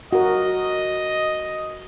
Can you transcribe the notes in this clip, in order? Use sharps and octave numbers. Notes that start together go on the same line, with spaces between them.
F#4 A#4 D#5